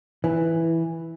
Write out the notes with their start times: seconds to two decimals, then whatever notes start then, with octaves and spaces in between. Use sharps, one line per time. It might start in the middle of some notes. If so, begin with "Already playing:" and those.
0.24 E3